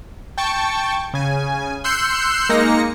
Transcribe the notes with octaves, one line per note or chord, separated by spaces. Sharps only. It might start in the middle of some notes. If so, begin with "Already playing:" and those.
G5 A5 C#6
C#3 G#5
C6 E6 F#6 G6 C7 C#7
G#3 A#3 D#4 A#6 C#7